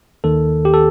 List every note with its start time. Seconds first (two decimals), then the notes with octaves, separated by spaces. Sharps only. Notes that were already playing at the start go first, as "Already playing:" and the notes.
0.24 D#2 D#3 A4
0.65 G4
0.74 A4